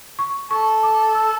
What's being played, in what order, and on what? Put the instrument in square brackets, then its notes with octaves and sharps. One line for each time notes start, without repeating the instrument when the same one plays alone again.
[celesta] C#6
[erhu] A4 [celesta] C#6
[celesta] D6
E6